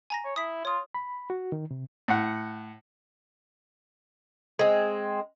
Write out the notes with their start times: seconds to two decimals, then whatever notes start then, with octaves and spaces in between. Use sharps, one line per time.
0.10 G#5 A#5 A#6
0.24 C#5
0.36 E4 D#6 B6
0.65 F4 C#5 D#6
0.94 B5
1.30 F#4
1.52 D#3
1.71 C3
2.08 A2 F#5
4.59 G#3 C4